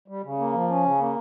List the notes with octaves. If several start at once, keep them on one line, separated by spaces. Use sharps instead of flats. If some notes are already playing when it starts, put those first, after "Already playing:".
G3
C#3
A#3
F3
C#4
C#3
A#3